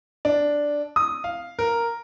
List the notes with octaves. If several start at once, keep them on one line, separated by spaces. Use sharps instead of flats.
D4
D#6
F5
A#4